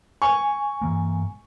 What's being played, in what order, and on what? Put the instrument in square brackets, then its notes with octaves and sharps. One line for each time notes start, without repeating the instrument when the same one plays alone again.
[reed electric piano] G#5 [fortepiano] C#6
[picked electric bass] G2 E3 A#3